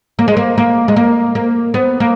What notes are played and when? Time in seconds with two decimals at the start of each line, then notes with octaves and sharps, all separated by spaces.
0.19 A#3
0.28 G#3
0.37 A#3
0.58 A#3
0.88 G#3
0.96 A#3
1.35 A#3
1.74 B3
2.00 A#3